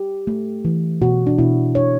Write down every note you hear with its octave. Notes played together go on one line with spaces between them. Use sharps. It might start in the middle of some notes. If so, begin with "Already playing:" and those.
Already playing: G4
A3
E3
B2 F#4
D4
B2 E4
D4 C#5